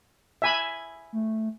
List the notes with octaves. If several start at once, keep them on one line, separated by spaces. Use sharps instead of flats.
E5 G#5 B5
A3